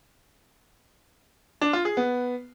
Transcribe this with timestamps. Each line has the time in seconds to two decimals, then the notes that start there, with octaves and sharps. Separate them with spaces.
1.61 D4
1.73 F4
1.85 G#4
1.97 B3